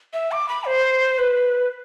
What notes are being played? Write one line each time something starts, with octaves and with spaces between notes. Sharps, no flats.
E5
D6
B5
C5
B4